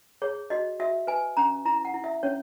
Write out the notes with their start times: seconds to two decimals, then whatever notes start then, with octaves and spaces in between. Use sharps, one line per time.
0.22 G#4 C#5
0.50 F#4 D#5
0.80 F#4 E5
1.07 B4 G#5
1.37 C#4 A#5
1.65 E4 A#5
1.85 F#5
1.94 E4
2.04 E5
2.23 C#4 C#5